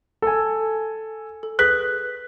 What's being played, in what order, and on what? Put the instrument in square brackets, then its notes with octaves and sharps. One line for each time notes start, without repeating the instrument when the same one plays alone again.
[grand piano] A4 G#5
[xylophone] A4
[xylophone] G#4 B4 B6 [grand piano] F#6